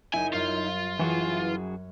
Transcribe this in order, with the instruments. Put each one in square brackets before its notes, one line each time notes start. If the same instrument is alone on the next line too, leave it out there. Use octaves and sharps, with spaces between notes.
[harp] F#1 [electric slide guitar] D#4 E4 [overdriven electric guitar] G#5
[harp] F#2 G3 [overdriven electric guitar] F4
[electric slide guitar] F#2 F#4 G#4 [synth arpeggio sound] E3 [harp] F#6